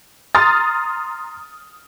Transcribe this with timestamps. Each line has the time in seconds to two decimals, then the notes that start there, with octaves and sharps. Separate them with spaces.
0.35 A#5 C6 D#6 F6 A6